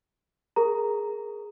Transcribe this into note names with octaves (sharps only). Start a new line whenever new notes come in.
G#4 A#4 A#5